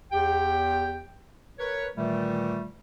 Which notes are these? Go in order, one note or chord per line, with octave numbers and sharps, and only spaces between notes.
E2 G4 G5
A#4 B4 C#5
A#2 D#3 E3 G3 A3